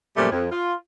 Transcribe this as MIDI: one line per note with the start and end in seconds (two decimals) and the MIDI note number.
0.17 0.31 42
0.17 0.31 46
0.17 0.31 53
0.17 0.31 55
0.17 0.31 57
0.32 0.47 41
0.52 0.74 65